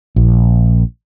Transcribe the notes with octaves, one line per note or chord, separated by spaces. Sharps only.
A#1